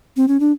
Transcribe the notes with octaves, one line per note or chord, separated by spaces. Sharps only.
C4
C#4
D4